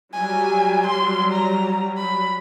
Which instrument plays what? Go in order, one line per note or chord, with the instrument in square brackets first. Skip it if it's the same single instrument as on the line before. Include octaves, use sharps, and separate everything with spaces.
[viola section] F#3 G3 [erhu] G#5
[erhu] C6
A#5
B5